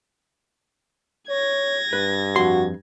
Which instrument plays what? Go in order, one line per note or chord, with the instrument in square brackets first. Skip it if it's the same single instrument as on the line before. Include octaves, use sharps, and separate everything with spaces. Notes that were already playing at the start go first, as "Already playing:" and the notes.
[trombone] C#5 [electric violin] G#6 A#6
[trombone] G2 [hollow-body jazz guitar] B4
[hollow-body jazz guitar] F2 C6 [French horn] F#4